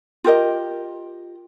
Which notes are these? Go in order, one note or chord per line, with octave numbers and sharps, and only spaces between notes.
F4 G4 A#4 D#5